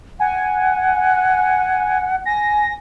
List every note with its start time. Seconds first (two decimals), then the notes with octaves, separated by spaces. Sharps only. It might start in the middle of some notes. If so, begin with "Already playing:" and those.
0.20 F#5 G#5
2.26 G#5 A#6